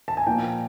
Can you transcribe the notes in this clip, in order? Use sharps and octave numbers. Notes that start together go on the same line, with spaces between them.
A5
G#5
A#2 F3 A#3 G5